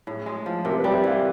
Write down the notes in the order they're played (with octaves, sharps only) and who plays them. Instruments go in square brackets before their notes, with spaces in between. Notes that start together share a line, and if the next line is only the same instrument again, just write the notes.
[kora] A2 [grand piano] G#4
[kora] G#3
F3
[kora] C3 [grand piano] A#4
[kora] G3 [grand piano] B4
[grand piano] E5
[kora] E3 [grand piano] F5